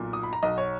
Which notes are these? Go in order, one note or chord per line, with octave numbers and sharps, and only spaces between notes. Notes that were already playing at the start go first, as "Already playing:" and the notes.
Already playing: B1 A#2
D#6
B5
A#5
B1 B2 D#5
C#5